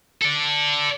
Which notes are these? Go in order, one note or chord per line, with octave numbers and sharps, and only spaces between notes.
A4 D5